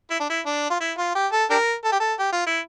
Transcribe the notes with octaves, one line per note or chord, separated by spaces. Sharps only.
E4
D4
E4
D4
F4
E4
F4
G4
A4
D4 G4 A#4
A4
G4
A4
G4
F4
E4